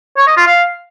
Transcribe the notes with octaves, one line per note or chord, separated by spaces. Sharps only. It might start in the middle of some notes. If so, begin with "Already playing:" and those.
C#5
D#5
F4
F5